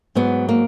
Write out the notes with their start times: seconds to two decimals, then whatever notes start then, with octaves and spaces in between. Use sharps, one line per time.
0.15 G#2 F#3 B3
0.49 A#3